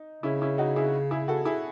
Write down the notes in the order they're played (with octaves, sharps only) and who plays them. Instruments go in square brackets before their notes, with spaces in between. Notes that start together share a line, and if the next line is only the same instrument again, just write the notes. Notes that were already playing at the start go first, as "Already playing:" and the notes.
Already playing: [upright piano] D#4
[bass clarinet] C#3 [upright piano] C#4 E4
[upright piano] C#4 E4
D#4 F#4
E4 G#4
E4 G#4
F#4 A4
E4 G#4